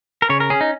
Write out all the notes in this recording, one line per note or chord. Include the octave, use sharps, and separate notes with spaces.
A#4
C#3 C#5
A#4
C#4 G#4
D#4